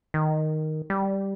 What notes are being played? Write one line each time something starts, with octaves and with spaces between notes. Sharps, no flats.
D#3
G3